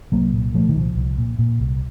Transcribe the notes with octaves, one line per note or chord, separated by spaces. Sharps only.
C2 F#3 A#3
A#2
A#2 F3 A3
D#3
C2 F3
C2
A#2
A#2
C2